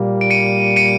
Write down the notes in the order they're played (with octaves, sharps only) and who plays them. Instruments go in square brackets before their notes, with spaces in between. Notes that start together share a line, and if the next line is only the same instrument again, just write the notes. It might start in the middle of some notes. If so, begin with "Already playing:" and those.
Already playing: [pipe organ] A#2 G3 A#3
[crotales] D7
C#7 D#7
C#7 D#7